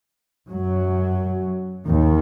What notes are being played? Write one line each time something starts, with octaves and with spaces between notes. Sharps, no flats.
F#2 F#3
D#2 D#3